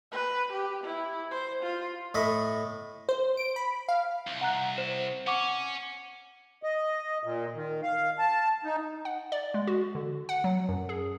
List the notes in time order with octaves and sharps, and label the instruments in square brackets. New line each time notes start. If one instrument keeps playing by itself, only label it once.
[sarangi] B4
G4
E4
C5
F4
[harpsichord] A2 A3 D#5 B5
[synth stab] C5
D7
B5
F5
[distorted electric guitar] C2
[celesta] F#5 A#5 F#6
C5 E7
[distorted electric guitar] C#4 [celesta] F#5 C#6 D6
[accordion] D#5
A#2
D#3
F5
A5
D#4
[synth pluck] F#5
D5
G#3
F#4
D3
F#5
F#3
F#2
G#4